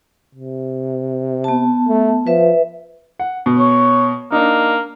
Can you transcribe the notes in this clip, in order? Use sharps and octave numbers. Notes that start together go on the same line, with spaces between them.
C3
B3 A5
A3
F3 B4 E5
F#5
B2
C#5
A#3 D4 D#4